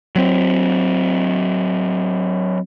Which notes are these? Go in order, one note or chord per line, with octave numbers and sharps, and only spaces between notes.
F#3 C4